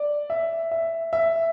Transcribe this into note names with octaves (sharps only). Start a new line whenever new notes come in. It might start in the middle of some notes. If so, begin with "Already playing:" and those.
Already playing: D5
E5
E5
E5